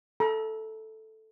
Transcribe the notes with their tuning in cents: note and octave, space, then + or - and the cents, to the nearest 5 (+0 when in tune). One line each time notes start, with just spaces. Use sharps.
A4 -5 A#5 +40